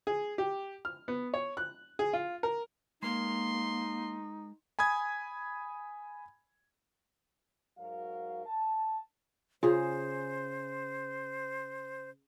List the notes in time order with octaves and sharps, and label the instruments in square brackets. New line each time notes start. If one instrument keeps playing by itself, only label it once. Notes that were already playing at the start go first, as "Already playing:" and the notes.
[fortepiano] G#4
G4
F6
B3
C#5
F#6
G#4
F4
A#4
[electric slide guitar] G#3 A#4 [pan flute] A#3 [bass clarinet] D#4 [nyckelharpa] C6
[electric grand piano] G#5 B5 D#6 G#6
[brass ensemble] G#2 F#3 F#4 A#4 F5
A5
[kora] C#3 G#4 [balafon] F4 [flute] C5